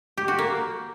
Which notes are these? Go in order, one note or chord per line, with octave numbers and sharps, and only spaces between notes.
G4
F#4
A#3